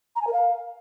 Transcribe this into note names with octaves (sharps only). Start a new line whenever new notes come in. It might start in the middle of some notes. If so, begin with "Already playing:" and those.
A#5
G#5
A#4
F5